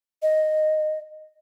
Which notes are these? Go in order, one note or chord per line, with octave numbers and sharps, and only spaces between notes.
D#5